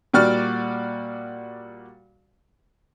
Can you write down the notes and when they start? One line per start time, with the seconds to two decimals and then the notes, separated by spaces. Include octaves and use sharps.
0.14 A#2 G3 F#4 D5 F6